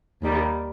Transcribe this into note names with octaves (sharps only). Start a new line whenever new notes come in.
D#2 D#3 G3